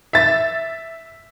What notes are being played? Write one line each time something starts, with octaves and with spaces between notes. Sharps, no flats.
E5 A6